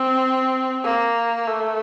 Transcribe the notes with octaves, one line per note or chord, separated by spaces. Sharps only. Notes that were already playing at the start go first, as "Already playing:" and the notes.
Already playing: C4
A#3
A3